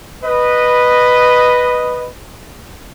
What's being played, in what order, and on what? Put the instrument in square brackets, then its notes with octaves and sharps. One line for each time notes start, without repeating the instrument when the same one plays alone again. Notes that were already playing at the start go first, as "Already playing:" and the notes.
[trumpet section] B4 D#5